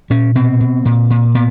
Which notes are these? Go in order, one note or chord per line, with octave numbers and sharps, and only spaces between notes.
A#2 C#4
B2 C4
B2
A#2
A#2
A#2 B3